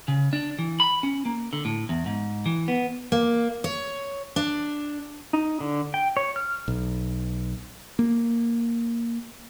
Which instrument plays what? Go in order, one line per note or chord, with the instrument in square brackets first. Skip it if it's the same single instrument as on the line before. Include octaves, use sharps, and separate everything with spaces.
[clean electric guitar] C#3
D4
E3
B5
C#4
A#3
D3
A2
E2
G#2
E3
B3
[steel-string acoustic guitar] A#3
C#5
D4
[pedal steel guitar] D#4
D3
G5
C#5
F6
[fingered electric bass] B1
A#3